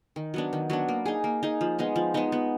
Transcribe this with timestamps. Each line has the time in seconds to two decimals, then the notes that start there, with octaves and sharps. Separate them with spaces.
0.16 D#3
0.34 F#3 B3 D4
0.53 D#3
0.70 F#3 B3 D4
0.89 A#3
1.06 D#4 G#4
1.24 A#3
1.43 D#4 G#4
1.61 F3
1.79 G#3 B3 D#4
1.96 F3
2.14 G#3 B3 D#4
2.32 B3